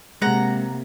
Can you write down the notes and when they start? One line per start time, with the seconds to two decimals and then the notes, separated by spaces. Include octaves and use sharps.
0.22 C3 G#3 A#3 F#5 A#5